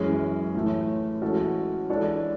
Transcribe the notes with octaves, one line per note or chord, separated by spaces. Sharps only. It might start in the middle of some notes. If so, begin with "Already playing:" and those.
Already playing: F#2 E3 G#3 C#4 G#4
A2 E3 A3
E3 G#3 C#4 F#4 A4
E3 G#3 D4 A4 C#5